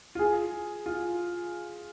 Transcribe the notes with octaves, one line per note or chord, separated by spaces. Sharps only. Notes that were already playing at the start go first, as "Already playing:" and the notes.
F4
G#4
F4